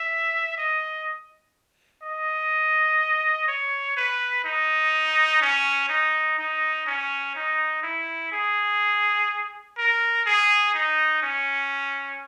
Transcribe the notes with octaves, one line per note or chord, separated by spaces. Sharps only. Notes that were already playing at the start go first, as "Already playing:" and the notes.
Already playing: E5
D#5
D#5
C#5
B4
D#4
C#4
D#4
D#4
C#4
D#4
E4
G#4
A#4
G#4
D#4
C#4